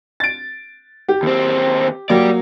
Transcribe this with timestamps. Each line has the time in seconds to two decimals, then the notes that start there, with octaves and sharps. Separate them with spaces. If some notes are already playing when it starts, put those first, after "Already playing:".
0.20 A6 D7
1.09 G4
1.23 D#2 C4
2.10 F#3 A#3 G4 D5